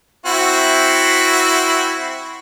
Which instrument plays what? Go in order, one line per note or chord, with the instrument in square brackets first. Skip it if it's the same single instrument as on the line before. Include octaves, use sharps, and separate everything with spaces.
[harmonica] C4 E4 F#4